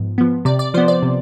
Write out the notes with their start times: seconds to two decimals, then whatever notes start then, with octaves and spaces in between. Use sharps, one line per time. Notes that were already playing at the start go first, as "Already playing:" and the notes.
Already playing: G#2 F3 B3
0.18 F3 B3
0.45 C3 D5
0.59 D5
0.74 F3 B3 C5
0.88 D5
1.02 C3